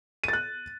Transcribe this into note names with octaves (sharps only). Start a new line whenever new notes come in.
F#6 A6 D#7